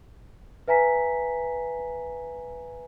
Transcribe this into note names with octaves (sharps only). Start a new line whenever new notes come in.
B4 E5 G#5 A#5 B6